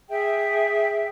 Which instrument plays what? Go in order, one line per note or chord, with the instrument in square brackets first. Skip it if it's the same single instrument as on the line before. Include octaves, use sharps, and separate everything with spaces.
[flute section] G#4 E5 G5